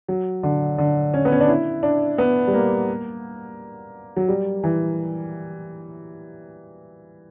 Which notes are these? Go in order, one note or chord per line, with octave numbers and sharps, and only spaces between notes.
F#3
D3
D3
C#4
B3
C#4
D4
E4
D4
B3
G3
A#3
F#3
G3
E3